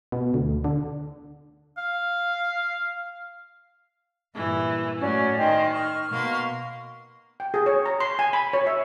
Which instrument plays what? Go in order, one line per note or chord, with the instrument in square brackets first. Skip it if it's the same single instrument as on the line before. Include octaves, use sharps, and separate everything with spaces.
[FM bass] B2
D2
D3
[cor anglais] F5
[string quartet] G2 A#2 E3
[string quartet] A2 F#3 [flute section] C#4 D5
[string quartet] D#3 [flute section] C5 D#5 G5
[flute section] C#6 F6
[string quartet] B2 A#3 C6
[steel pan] G5
G#4
C#5
A#5
C6
G#5
B5
C#5
E5